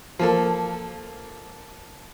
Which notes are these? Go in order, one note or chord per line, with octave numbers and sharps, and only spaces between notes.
F3 A#3 A4